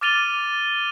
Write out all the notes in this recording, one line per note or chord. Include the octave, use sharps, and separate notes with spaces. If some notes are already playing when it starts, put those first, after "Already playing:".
D6 F6 A6 D#7 F7 G7